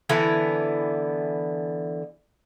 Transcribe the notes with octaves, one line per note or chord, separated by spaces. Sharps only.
D3 E3 B3 E4